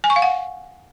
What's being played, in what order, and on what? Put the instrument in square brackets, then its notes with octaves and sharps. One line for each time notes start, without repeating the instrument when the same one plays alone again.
[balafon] G#5
C#6
F5
F#5